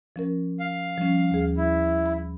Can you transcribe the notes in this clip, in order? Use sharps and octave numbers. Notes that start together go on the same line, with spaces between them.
F3 C#4 A#4
F5
F3 G3 C#4
D#2 G#4
E4
B5